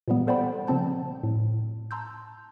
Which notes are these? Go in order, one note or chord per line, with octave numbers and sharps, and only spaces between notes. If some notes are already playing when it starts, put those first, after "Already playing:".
A#2 E3 F#3 G3 B3
A4 C5 D5 F#5 G5 B5
C#3 F3 C4 A5 G6
A2
A5 A#5 C6 E6 G6